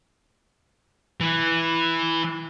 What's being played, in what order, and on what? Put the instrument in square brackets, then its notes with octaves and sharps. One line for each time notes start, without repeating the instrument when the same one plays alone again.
[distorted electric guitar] E3